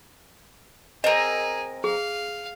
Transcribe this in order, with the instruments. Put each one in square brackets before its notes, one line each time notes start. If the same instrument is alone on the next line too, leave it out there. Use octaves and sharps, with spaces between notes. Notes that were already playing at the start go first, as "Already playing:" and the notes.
[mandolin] C4 A#4 [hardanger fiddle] G#4 [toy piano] D#5
[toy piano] G#4 [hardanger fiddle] F5